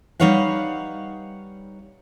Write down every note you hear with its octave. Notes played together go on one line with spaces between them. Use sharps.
G3 D#4 B4 C#5 F5 F#5